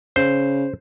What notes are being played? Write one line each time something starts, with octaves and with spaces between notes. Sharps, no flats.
C#3 C5